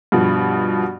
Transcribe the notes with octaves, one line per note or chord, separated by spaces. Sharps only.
G2 B2 F3